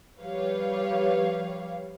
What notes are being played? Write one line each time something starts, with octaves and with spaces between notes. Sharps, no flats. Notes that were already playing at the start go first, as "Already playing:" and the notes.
F3 G3 G4 B4 C#5 F5